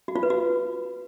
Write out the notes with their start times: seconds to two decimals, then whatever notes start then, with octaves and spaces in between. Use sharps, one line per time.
0.08 F#4
0.16 F4
0.23 B4
0.30 F#4